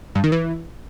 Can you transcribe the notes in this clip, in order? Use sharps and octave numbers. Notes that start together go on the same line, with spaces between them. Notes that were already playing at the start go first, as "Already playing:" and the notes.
G2
D#3
E3